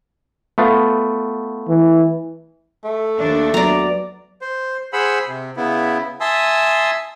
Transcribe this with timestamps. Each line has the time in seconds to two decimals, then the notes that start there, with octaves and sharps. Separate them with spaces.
0.58 A3 B3 F4
1.69 E3
2.84 A3
3.17 D#2 D4
3.54 F#3 B3 D5 A#5
4.41 C5
4.93 G#4 C5 F#5 B5 E6
5.27 C3
5.57 C#3 B3 E4
6.21 E5 G#5 A5 C6 D#6 E6